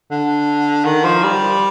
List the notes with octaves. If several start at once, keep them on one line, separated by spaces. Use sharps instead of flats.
D3
D#3
F3
G3